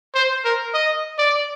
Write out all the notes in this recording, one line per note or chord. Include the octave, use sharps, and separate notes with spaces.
C5
A#4
D#5
D5